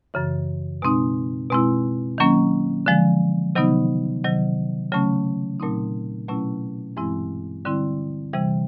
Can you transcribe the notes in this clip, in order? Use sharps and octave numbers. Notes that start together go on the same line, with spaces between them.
F#2 C#3 E3
B2 G#3 C4 D#4
B2 G#3 C4 E4
D#3 F#3 A#3 C#4
D3 F3 G#3
C3 D#3 F#3 B3 D#4
C3 D#3 F#3
C#3 F#3 A3 C#4
A#2 F#3 A3 C4 D#4
B2 F#3 A3 C#4 E4
G2 E3 G#3 C4 E4
D3 G3 C4 E4
C3 E3 G3